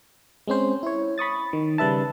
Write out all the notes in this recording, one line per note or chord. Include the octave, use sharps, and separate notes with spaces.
G#3 C4 C#4 C5
E4 C#5
B5 C#6 D#6 A6
D#3
C#3 G3 B4 E5 A5